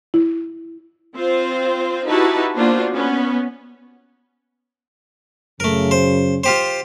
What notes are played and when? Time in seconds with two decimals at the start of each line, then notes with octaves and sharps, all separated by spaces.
0.14 E4
1.16 C4 F4 C5
2.07 D#4 E4 F#4 G4 B4 A5
2.56 A#3 B3 D4 F4 F#4 C5
2.92 B3 C#4
5.60 F#2 C#3 A3 A#4
5.91 C5
6.44 F4 G4 C5